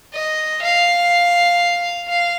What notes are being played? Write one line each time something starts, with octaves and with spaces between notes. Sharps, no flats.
D#5
F5
F5